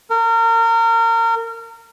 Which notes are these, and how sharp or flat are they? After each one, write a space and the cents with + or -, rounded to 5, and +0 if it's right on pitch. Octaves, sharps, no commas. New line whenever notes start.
A#4 -30